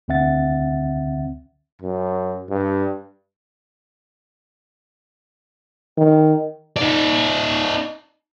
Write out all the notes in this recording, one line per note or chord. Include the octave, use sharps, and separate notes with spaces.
D2 D3 C4 E5 F#5 A6
F#2
G2
D#3
D#4 D5